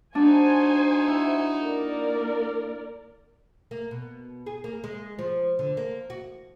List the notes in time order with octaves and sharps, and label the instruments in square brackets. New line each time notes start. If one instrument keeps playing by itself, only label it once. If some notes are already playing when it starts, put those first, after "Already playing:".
[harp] D4 [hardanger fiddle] D#4 F#4 [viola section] C5 G#5
[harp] E4
[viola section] A#3 A#4 D5
[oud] A#3
B2
G#4
A#3
G#3
F3
D3
A#3
F#4